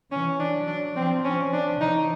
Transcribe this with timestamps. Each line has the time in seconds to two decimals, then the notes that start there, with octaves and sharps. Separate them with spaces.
0.11 E3 C#4
0.39 D4
0.54 F#3
0.68 D4
0.96 F3 C4
1.25 C#4
1.53 D4
1.80 E3 D#4